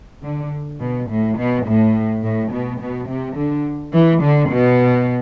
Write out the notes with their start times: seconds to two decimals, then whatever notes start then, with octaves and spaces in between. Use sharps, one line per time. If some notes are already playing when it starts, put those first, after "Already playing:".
0.23 D3
0.80 B2
1.09 A2
1.37 B2
1.66 A2
2.23 A2
2.52 B2
2.80 B2
3.08 C3
3.36 D3
3.93 E3
4.22 D3
4.50 B2